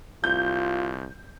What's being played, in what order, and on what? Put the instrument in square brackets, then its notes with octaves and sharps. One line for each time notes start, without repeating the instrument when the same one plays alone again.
[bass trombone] C2 [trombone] F4 [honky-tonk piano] G6